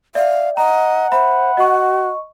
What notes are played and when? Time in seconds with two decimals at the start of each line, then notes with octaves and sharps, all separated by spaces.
0.15 D5 E5 F5
0.57 D#5 F#5 A#5
1.12 C5 E5 B5
1.57 F#4 D#5 C#6